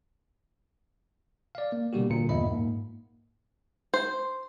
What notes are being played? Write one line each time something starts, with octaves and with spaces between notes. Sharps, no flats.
D5 F5
A#3
B2 D3 G3 A#3 F#4 G4
A1 A#2 D3 A#3 C#7
E2 G2 A#2 D#5 E5 B5
G#2 A#3
C5